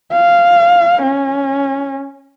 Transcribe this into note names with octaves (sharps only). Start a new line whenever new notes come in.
F5
C#4